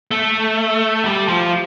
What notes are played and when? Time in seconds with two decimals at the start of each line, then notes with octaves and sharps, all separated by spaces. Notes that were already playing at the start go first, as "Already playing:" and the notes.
0.11 A3
1.05 G3
1.28 F3